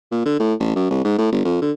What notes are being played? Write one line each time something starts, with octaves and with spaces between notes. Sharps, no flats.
A#2
D3
A2
A1
F#2
C2
G#2
A2
G1
F2
D3